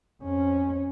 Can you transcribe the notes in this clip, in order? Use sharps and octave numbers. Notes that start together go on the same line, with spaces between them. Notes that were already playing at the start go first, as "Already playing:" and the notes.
F2 C#4